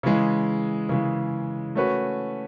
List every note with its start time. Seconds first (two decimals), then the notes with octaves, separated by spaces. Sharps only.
0.03 C#3 E3 G#3
0.89 C#3 E3 G#3
1.75 A3 C#4 F#4 B4